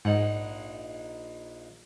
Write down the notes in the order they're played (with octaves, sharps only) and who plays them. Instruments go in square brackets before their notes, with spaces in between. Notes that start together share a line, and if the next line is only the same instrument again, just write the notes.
[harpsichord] A#1 D#4 F#5 [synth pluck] G#2